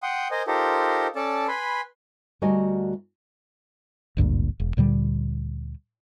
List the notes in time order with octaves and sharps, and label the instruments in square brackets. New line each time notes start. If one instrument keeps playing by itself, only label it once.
[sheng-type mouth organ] F#5 G5 C6 D#6
A#4 C5 D#5 G#5
D#4 F4 G4 A4 A#4 C5
C#4 A4 D5 A5
B4 G#5 B5 C6
[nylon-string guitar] D2 G3 F#4 A#4 D#5 G#5
[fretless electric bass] G#1 D2 G2 A#2
E1
D2 A#2 D3 G3